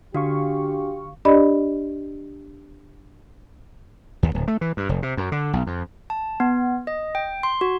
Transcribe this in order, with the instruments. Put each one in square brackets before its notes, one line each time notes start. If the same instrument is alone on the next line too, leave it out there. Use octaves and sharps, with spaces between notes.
[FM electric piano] D3 F5 C#6 [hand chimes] D4 F#4 [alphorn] G4
[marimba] D4 G4 D5 D#5 B5
[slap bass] D#2
D1
A3
E3
G2
F1
C3
F#2
D3
B1
F2
[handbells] A5
B3
D#5
G5
C6
F#4